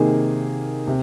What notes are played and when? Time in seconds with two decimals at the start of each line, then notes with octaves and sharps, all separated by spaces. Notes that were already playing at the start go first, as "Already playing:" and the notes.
Already playing: C3 D#3 A#3 D#4 G#4
0.87 C3